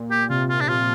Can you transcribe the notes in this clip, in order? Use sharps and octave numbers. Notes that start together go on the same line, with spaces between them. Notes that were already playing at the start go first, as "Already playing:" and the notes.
Already playing: A#2
A#2 G4
C3 F4
F4
D4
F3 F4